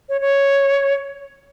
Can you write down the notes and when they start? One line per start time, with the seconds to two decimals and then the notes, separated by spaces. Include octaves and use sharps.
0.09 C#5
0.21 C#5